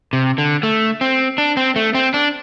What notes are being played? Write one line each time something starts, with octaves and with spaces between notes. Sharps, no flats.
C3
D3
A3
C4
D4
C4
A3
C4
D4